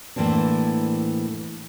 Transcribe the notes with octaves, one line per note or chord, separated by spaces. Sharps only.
A2 E3 A#3 C4 D4